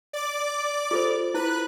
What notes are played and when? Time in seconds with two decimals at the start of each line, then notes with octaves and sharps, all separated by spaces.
0.13 D5 D6
0.91 F4 A4 C5
1.34 E4 B4 F#6